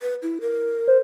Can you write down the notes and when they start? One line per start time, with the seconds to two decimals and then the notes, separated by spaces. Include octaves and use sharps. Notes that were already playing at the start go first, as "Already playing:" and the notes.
0.02 B4
0.22 E4
0.41 A#4
0.88 C5